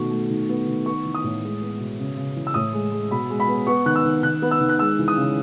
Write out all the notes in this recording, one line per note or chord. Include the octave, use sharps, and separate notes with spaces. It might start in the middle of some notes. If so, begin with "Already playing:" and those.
Already playing: B2 D#3 A3 C#6
A3
D#3
B3
D#3
B3 C#6
E3
D#6
A2
G#3
B3
B2
C#3
C#3
E3
E6
A2 D#6
G#3
G#3
B2 B5
G#3
B5
B3
B3 C#6
D#3 F#6
E6
D#3
D#3 F#6
B3
E6
D#3
F#6
G#3 E6
E3
D#6
C#3